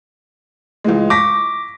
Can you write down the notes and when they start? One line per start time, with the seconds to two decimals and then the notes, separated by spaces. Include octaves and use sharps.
0.84 C#2 E3 G#3
1.10 C#6 D6 A#6 B6